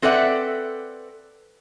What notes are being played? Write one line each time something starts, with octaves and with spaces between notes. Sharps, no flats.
C4 A4 B4 D5 E5 F#5